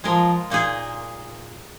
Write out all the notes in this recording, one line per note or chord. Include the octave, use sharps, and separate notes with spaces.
F3 G#3 F4 A#4
A#2 A#3 D#4 G#4